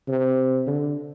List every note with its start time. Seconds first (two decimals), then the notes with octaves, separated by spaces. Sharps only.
0.08 C3
0.67 D3